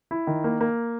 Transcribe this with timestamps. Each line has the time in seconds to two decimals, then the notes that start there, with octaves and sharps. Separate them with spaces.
0.11 E4
0.27 D#3
0.44 A#3
0.61 A#3